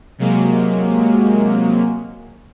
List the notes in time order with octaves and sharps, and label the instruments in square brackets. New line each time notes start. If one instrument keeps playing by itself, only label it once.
[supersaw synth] C3 F#3 G#3 A#3